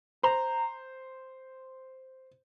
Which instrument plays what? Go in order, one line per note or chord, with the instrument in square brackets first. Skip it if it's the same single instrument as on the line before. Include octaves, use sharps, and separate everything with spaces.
[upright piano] C5 [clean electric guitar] A#5